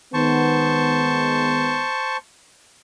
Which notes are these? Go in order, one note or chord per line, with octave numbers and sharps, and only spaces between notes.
D#3 G#3 B3 C5 A5 C#6